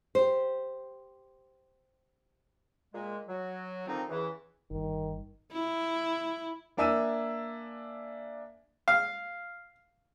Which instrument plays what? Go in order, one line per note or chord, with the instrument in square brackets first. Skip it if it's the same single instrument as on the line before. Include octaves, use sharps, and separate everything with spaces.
[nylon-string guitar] G4 C5
[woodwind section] A#2 G#3
F#3
D3 D#3 F3 C4 D#4
E2 C#3 E3
[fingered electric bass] G1 G2 [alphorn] D#3
[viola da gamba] E4
[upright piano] A#3 D4 E5 G#5 E6 D#7
[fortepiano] F5